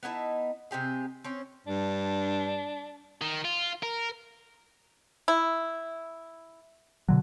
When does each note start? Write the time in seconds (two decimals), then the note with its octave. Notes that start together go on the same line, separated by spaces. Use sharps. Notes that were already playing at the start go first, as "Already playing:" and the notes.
0.03 B3 D#4 E4 A5
0.71 C3 C4 G4 G#4
1.24 C4 C#4 C#5
1.67 G2 D4
3.22 D#3
3.45 F4
3.83 A#4
5.28 E4
7.09 B2 D3 F#3